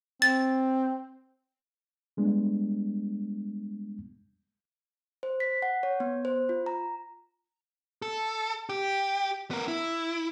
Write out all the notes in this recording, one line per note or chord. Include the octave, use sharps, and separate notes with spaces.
C4 A6
G3 G#3 B3 D4
C5
B6
F#5
C#5
B3
C5
F4
A#5
A4
G4
B3 A#4
E4